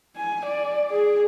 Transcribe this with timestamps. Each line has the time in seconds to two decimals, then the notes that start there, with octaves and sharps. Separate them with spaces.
0.16 G#5
0.46 D5
0.90 G#4